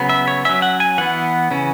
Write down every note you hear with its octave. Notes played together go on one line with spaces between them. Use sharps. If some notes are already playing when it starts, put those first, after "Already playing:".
Already playing: C#3 F#3 B3
E5
C#5
F#3 C#4 E5
F#5
G#5
E3 B3 F#5
C#3 E3 C#4